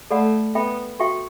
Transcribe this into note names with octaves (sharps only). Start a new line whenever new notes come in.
A3 A4 D5 F#5 B5
B3 A4 E5 G5 B5
F#4 A4 E5 G5 C#6